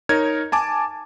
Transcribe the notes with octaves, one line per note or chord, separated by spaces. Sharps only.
D#4 A#4 C#5 G#6
G#5 A5 D6